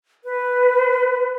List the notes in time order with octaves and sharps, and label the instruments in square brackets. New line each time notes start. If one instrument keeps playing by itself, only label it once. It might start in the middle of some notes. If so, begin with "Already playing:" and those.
[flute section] B4